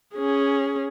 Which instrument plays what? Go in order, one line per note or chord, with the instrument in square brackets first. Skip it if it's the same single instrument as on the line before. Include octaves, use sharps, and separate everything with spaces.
[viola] C#4 G#4